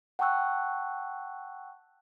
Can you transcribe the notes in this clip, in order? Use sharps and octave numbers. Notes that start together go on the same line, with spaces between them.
F#5 G5 A5 C#6 E6 F#6